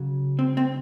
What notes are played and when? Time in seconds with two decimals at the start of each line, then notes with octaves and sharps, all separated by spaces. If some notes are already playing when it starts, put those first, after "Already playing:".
Already playing: C#3 F#3
0.39 C4
0.57 C4